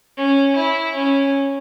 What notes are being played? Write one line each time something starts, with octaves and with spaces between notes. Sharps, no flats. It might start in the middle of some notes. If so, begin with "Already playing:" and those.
C#4
E4
C#4